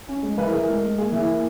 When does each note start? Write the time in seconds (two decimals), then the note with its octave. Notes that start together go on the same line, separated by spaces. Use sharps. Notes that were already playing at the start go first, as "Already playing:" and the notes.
0.09 C#4
0.23 G#3
0.38 E3 B4
0.45 A#4
0.52 E3 G#4
0.59 A#4
0.68 G#3
0.83 G#3
0.98 A#3 G#4
1.12 E3
1.28 A#3